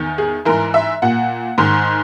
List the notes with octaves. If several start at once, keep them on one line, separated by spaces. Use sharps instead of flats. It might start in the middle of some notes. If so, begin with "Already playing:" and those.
Already playing: E2 D#3
G#4
G#2 E3 A#4
E5
A#2 F#5
G#2 D#3